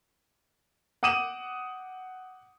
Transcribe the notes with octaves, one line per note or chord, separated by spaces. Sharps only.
F#5 D6 D#6 D#7 E7 F#7